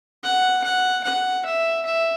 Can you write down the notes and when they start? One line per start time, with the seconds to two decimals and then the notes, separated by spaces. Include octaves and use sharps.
0.23 F#5
0.64 F#5
1.04 F#5
1.45 E5
1.86 E5